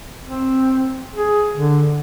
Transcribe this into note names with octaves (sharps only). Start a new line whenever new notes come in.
C4
G#4
D3